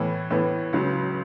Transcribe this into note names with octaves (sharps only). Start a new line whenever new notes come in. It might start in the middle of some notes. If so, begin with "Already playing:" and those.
Already playing: A2 E3 B3
A2 E3 B3
C#2 C#3 F#3